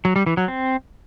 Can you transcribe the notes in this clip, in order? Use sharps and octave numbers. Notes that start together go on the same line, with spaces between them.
F#3
G3
E3
F#3
C4